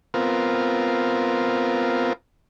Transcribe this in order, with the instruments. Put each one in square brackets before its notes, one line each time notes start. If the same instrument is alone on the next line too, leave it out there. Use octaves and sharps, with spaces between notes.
[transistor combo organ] B3 C4 F4 A#4